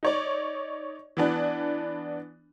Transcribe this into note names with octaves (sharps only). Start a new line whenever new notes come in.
D#4 C#5 D5
E3 B3 D4